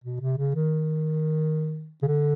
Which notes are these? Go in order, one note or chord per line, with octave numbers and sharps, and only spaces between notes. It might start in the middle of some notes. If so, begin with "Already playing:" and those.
B2
C3
C#3
D#3
C#3
D3